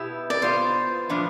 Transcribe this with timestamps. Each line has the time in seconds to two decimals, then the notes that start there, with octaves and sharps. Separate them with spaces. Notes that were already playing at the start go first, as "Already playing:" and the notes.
Already playing: B2 B3 E4 G4 E5
0.30 D5
0.42 B2 B3 F4 C5
1.09 A2 F3 B3 D4